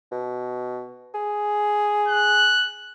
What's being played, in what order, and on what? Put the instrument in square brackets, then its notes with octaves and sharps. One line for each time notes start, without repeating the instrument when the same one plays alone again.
[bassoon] B2
G#4
[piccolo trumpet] F#6